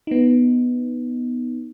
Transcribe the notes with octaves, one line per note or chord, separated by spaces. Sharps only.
B3 D#4